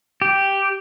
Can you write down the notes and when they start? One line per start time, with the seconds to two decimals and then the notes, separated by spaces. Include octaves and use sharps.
0.22 G4